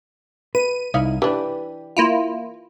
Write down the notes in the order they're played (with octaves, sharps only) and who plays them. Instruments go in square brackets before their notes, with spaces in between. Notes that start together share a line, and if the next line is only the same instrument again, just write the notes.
[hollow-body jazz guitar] B4 [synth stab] D#7
[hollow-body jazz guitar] C2 [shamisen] D#4 E4 F5
[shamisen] E3 D4 [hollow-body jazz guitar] G4 B4
[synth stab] A#3 E4 F4